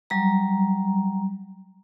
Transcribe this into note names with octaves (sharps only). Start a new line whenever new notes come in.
F#3 G3 A#5